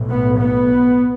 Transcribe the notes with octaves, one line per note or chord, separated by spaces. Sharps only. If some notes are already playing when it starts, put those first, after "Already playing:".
Already playing: B1 A2
B3
B3